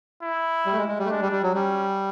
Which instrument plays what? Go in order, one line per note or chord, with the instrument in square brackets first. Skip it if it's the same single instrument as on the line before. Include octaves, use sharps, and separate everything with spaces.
[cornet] E4
[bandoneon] G3
A3
G#3
G#3
G3
A3
[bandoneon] G#3 [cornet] D4
[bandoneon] G3
G3
F#3
[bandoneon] G3 [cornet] C#4